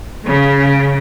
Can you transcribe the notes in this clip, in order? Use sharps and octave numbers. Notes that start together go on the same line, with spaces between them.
C#3